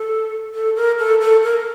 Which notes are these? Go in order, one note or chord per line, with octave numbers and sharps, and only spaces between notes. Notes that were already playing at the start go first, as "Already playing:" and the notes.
Already playing: A4
A4
A#4
A4
A4
A#4